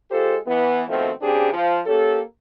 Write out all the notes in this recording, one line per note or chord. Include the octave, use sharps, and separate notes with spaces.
G#3 F4 G4 A4 C5
E3 B3
B2 D#3 F3 A3 C4
C#3 C4 D4 G4 G#4
F3
A#3 C#4 G4 A4